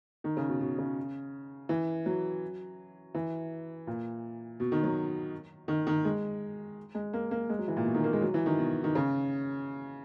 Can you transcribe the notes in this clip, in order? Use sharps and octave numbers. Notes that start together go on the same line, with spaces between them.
D#3
C#3
B2
B2
C#3
E3
F#3
E3
A#2
B2
D#3
F#3
D#3
D#3
G#3
G#3
A#3
A#3
G#3
F#3
E3
A#2
B2
D#3
A#3
G#3
F#3
E3
D#3
B2
D#3
C#3